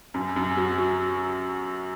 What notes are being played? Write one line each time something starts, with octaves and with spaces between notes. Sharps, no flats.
F#2
F#2
F#3
F#3